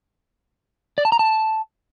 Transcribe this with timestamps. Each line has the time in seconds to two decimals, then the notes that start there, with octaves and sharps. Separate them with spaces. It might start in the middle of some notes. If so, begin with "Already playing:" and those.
0.98 D5
1.05 A5
1.12 A#5
1.19 A5